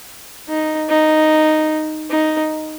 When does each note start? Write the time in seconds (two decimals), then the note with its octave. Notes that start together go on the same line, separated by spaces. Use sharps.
0.49 D#4
0.89 D#4
2.10 D#4